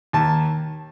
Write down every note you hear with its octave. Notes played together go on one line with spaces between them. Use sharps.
D#2 A5